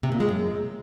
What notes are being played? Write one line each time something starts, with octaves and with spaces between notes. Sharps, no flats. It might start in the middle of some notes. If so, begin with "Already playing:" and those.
C3
A#2
G#3
F#2